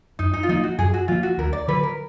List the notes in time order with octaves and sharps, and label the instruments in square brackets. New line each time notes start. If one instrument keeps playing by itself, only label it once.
[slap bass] F#2 [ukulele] D#4
[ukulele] D#4
F4
[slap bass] F3 A#3 [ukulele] D#4
[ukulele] F#4
[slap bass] F#2 [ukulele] G#4
[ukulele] F#4
[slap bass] F3 A#3 [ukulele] F4
[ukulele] F#4
[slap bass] D2 [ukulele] A#4
[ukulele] D5
[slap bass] D3 F#3 [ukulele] B4
[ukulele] A#4